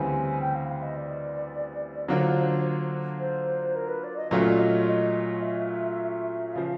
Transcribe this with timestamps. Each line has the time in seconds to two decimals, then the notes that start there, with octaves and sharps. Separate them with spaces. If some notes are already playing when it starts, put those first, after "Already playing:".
Already playing: D2 C#3 E3 G3 C4 G#5
0.41 G5
0.55 F5
0.69 F5
0.82 D#5
0.97 D5
2.08 D3 F#3 A#3 D4 F4 C5
3.20 C5
3.76 A#4
3.89 B4
4.04 D5
4.17 D#5
4.31 A#2 F#3 A3 C#4 F4 D5
4.53 D5
4.59 D#5
4.87 D#5
5.42 E5
6.53 C#3 F3 F5